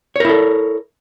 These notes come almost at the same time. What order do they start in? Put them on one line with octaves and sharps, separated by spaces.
C#5 A#4 E4 A4